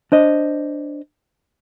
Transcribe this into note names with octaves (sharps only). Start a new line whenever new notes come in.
D4 C5 D#5